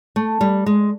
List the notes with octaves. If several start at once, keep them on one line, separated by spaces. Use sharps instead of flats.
A3
G3
G#3